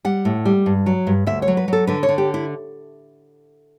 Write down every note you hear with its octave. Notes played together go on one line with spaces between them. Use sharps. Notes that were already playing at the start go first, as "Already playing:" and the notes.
G3 F#5
A2
G3
G2
F#3
G2
D2 E5
C#5
F#3
B4
F#3 A4
D3 B4
C#5
D3
G4
E4